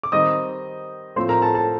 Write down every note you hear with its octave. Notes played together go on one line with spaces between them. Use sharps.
D6
D#3 G3 C4 D#5 D#6
A2 F3 A3 C4 C5 C6
A#4 A#5
A4 A5
A4 A5